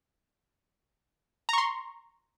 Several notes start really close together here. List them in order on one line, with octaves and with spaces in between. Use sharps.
A#5 C#6 C6